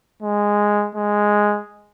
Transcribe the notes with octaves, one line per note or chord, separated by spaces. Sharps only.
G#3
G#3